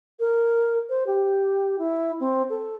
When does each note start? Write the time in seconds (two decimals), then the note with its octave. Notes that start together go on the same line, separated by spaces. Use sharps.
0.20 A#4
0.90 C5
1.07 G4
1.79 E4
2.20 C4
2.50 A4